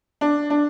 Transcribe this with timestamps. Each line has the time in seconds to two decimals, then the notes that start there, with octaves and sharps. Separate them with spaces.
0.21 D4
0.50 D4